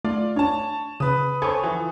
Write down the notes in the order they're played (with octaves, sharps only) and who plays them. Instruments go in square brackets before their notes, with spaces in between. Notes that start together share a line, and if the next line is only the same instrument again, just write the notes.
[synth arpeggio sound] A3 [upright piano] F4 D5 F5
[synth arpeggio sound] D4 [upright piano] C#5 A5
[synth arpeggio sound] C#3 [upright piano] B4 D#6
[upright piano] A4 C5 C#5 [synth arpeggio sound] G#5 B5 C#6
[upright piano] E3 F3